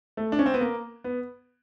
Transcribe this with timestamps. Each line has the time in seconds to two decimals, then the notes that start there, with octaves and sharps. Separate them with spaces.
0.17 A3
0.32 D4
0.39 C#4
0.46 C4
0.54 B3
0.61 A#3
1.04 B3